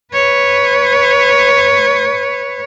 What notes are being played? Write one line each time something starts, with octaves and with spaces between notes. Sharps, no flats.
B4 C#5